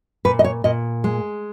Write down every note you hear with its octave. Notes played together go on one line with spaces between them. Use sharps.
A#2 B4
D#5
C#5
A#2 D#5
G#3